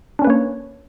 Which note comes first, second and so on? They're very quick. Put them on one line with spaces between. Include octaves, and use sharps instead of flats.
D4 C#4 B4 A#3 C#5